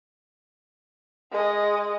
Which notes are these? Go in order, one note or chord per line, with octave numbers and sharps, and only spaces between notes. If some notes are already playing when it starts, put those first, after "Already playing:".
G#3 D#5